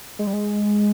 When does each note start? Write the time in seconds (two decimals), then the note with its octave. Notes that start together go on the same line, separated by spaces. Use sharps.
0.19 G#3
0.27 G3
0.33 G#3